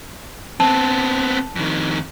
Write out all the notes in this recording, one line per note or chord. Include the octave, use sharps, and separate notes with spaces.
B3 C4 A5
F2 D#3